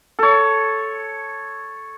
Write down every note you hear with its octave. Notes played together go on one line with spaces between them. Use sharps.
A4 C#5